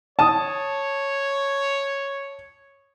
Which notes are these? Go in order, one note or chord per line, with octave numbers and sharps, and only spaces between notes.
C#5 A5 D#6